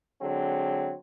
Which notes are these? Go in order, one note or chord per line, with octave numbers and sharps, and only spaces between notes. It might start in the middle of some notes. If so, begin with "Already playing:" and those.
D3 F#3 G#3 C4